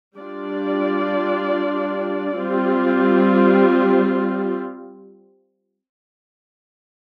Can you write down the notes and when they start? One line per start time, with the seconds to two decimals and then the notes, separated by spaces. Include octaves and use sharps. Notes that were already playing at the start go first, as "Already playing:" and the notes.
0.17 G3 D4 F4 D5
2.38 G3 C4 F4